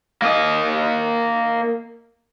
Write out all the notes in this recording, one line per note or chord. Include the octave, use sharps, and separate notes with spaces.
A#3 D#5